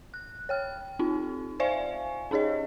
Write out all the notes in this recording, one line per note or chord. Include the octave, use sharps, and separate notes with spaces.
F#6
C#5 G5 F6
C4 D#4 F4
C5 D5 E5 F5 G#5 C#6
C#4 D#4 G#4 C#5 D#5